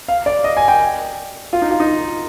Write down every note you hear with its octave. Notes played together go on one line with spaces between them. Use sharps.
F5
D5
D#5
G#5
G5
F4
D#4
F4
D#4